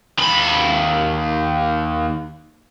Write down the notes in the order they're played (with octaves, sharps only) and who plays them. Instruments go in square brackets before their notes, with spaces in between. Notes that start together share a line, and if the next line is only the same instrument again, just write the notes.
[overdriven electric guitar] D#2 B5